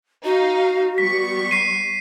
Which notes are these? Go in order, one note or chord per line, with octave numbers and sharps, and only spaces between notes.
D#4 F#4 F5
G3 B3 C#6 B6
B6 C7 D#7